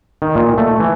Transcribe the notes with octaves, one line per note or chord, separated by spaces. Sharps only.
D#3
A#2
A3
E3